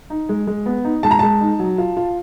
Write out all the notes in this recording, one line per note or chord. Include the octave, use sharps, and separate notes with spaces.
D#4
G#3
G#3
B3
D#4
G#3 A5
A#5
G#3 A5
D#4
F#3
F4
F4